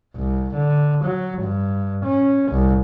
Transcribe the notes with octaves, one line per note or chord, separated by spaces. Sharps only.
C2
D3
F#3
G2
C#4
C2